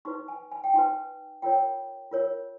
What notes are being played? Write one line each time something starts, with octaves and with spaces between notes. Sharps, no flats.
D#4 F#4 B4 C#6
G#5
G#5
G5
D#4 F#4 B4 G#5
F4 A#4 C#5 G5
F4 A#4 C#5